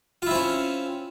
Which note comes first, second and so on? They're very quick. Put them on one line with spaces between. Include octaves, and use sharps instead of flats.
F4 E4 C4 C#4